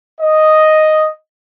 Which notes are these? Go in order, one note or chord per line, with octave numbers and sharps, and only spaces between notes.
D#5